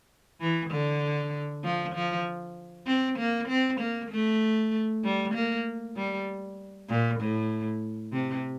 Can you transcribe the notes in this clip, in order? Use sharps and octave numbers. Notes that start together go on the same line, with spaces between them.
E3
D3
F3
F3
C4
A#3
C4
A#3
A3
G3
A#3
G3
A#2
A2
C3